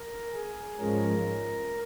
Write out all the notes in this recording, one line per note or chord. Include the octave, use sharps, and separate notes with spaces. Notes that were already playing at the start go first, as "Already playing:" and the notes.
Already playing: A#4
G#4
G#2 F3 G#3 C#4 A#4